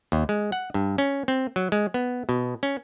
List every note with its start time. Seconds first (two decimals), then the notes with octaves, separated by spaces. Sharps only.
0.12 D#2
0.29 G#3
0.52 F#5
0.74 G2
0.98 C#4
1.28 C4
1.56 F#3
1.72 G#3
1.94 B3
2.29 B2
2.63 C#4